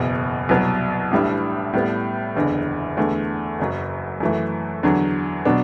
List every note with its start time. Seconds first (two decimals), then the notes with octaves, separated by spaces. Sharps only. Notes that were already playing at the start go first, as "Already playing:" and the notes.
Already playing: F#1 E2 B2
0.49 C2 B2 F#3 B3
1.11 A1 A2 G3 D4
1.73 A2 G3 B3
2.36 F#1 E2 D3
2.97 E2 D3 A3
3.59 F#1 F#2 F#3
4.20 F#2 E3 A3
4.83 E2 D3 F#3
5.45 B2 F#3 B3 D4